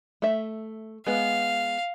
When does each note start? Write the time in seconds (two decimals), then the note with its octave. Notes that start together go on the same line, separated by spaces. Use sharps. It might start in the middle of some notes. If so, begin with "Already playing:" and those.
0.22 A3 E5
1.07 G#3 B3 F5